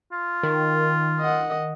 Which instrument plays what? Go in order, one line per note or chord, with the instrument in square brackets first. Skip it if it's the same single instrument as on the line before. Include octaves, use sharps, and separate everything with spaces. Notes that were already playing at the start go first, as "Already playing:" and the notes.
[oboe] F4
[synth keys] D#3
[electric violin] D#5 F#5